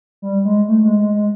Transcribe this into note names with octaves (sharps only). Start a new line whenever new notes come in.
G3
G#3
A3
G#3
G#3
G#3